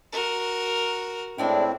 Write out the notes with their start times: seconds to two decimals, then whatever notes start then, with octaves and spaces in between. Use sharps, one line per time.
0.12 F#4 A#4
1.38 A2 G#3 C4 D4 E4